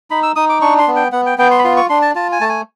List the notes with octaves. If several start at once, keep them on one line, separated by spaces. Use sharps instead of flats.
D#4 B5
E6
D#4 D#6
D6
D4 C#6
C6
B3
G5
B3 F#5
G5
B3 G5
C6
B5
F4 C6
C#6
D4 C6
A5
F4 A5
G#5
A3 A5
G#5